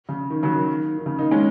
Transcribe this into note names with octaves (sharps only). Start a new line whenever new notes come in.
C#3
D#3
C#3 F#3
D#3
D#3
C#3
A#3 D#4
G#3 C#4